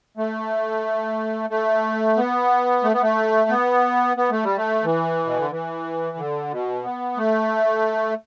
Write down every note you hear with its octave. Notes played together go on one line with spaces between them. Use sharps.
A3
A3
B3
A3
B3
A3
B3
B3
A3
G3
A3
E3
B2
D3
E3
D3
B2
B3
A3